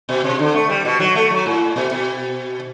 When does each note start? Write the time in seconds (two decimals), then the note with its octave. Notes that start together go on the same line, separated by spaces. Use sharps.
0.09 B2
0.24 C3
0.39 D3
0.54 A3
0.69 G3
0.85 B2
1.00 F#3
1.15 A3
1.30 F#3
1.46 A2
1.76 B2
1.91 B2